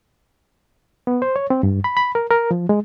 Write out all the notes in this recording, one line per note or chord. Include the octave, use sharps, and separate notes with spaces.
B3
C5
C#5
C4
G2
B5
B5
A#4
A#4
F3
G#3